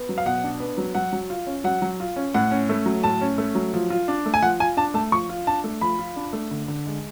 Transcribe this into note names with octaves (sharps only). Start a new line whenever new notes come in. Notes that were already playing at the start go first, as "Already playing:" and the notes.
Already playing: B3
F#3
F5
B2 F#5
D4
B3
F#3
F#3 F#5
F#3
F4
C#4
F#3 F#5
F#3
F4
C#4
A2 F#5
C#4
A3
F#3
A2 A5
C#4
A3
F#3
F3
F4
D4
A3
G#5
F3 F#5
F4 G#5
D4 A5
A3 A5
F3 C#6
F4
D4 A5
A3
F3 B5
F4
D4
A3
D3
D3
G#3